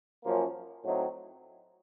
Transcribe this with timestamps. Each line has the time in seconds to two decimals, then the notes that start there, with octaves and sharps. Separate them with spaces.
0.23 F#2 F3 A#3 C#4 F4
0.84 A2 F#3 C4 D#4